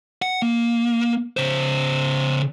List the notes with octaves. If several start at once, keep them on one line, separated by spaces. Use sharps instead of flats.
F#5
A#3
C#3 C5